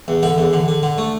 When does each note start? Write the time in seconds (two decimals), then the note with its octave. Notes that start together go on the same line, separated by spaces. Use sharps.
0.08 E2
0.23 D3 E5
0.38 E2
0.53 D3
0.68 D3
0.83 D3
0.98 A3